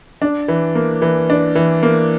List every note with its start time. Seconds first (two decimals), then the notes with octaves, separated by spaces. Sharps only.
0.22 D4
0.48 E3
0.75 A#3
1.02 E3
1.30 D4
1.55 E3
1.83 A#3